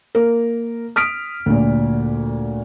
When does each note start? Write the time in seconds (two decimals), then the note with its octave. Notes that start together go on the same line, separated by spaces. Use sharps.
0.15 A#3 A#4
0.96 D#6 F6 B6 D7
1.46 D2 A#2